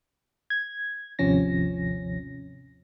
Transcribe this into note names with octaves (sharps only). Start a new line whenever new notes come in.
G#6
G#1 D#2 C3 F3 C#4 A#6